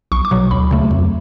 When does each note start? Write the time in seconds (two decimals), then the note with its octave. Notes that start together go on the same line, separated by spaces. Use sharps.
0.12 B1 C#6
0.25 D6
0.31 B2 F#3
0.51 D2 B5
0.71 C#3 F#3 A3
0.91 F2